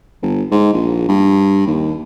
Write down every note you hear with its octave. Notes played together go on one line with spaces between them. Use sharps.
G1
G#2
A#1
G2
D#2